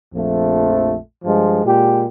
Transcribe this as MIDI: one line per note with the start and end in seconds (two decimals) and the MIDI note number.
0.14 0.96 34
0.14 0.96 41
0.14 0.96 53
0.14 0.96 57
1.24 1.65 43
1.24 1.65 53
1.24 1.65 56
1.66 2.06 46
1.66 2.06 56
1.66 2.06 67